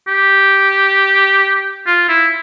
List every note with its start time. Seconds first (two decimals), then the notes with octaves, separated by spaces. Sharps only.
0.08 G4
1.86 F4
2.09 E4